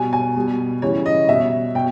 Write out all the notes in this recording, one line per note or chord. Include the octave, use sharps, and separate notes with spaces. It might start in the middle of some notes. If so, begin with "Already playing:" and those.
Already playing: B2 G3 G#5
G#5
B2 G3
C#3 E3 G3 C#5
D#5
B2 G3 E5
B2 G5